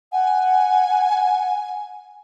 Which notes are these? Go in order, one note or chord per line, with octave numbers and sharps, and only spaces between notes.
F#5 G#5